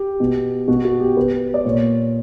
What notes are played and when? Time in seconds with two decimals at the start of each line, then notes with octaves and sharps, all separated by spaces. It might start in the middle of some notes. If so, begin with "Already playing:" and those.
Already playing: G4
0.20 B2
0.68 B2 F#4
0.85 F#4
1.00 G4
1.17 B2 B4
1.54 D5
1.64 A#2 C#5